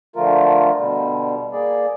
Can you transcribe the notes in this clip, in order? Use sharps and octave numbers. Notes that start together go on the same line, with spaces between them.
D3 F3 A3 F4 A#4
B2 D3 G3
A#3 G#4 D5